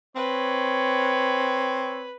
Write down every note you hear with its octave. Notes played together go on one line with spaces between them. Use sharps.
C4 B4 C#5